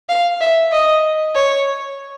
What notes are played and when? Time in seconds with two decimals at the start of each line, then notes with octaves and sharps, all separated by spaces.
0.09 F5
0.41 E5
0.72 D#5
1.35 C#5